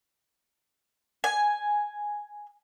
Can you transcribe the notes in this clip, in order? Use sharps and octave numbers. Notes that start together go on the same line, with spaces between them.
G#5